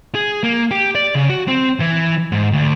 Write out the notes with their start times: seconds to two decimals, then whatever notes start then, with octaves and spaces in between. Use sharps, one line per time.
0.15 G#4
0.43 A#3
0.71 G4
0.95 D5
1.15 C#3
1.30 F#4
1.48 C4
1.80 E3
2.32 G#2
2.52 D2